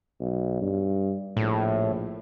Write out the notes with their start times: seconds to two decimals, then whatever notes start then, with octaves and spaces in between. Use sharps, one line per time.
0.20 B1
0.62 G2
1.37 A#1 A2